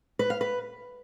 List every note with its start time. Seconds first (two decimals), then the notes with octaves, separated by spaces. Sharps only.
0.19 B4
0.30 F5
0.41 B4